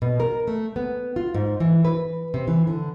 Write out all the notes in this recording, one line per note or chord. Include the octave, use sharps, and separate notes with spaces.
B2
A#4
A3
B3
F4
G#2
E3
B4
C3
E3
D3